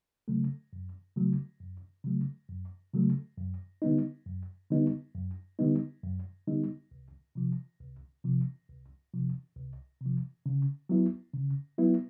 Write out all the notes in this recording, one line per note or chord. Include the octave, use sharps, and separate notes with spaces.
C#3 F#3 A3
F#2
C#3 F#3 A3
F#2
C#3 F#3 A3
F#2
C#3 F#3 A3
F#2
D3 G3 B3 D#4
F#2
D3 G3 B3 D#4
F#2
D3 G3 B3 D#4
F#2
D3 G3 B3 D#4
C2
C3 F3
C2
C3 F3
C2
C3 F3
C2
C3
F3
C#3
F#3 B3 E4
C#3
F#3 B3 E4